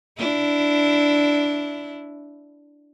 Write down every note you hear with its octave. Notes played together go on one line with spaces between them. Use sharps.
D4 E4